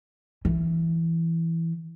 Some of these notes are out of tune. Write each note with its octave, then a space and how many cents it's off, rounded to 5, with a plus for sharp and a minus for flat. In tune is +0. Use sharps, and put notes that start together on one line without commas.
E3 +5